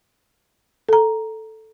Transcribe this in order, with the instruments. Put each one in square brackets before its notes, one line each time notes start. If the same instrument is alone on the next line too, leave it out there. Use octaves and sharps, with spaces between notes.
[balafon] A4 A#5